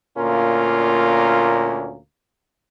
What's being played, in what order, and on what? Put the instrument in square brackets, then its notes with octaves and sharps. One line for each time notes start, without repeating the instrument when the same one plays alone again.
[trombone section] D2 A#2 A#3 C#4 F4 A#4